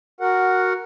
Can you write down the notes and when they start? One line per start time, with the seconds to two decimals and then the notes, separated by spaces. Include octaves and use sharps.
0.21 F#4 A#4 F#5